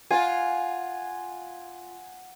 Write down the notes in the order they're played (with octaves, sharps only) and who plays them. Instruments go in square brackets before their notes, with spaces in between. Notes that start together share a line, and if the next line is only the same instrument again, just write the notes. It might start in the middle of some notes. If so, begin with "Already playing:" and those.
[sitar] F4 [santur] F#5 G#5